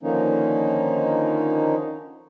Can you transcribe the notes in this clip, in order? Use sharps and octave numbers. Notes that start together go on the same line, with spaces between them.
D3 D#3 F3 A#3 C#4 D#4